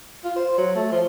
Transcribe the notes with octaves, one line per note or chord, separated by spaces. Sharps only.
F4
C5
F#3
A3
F3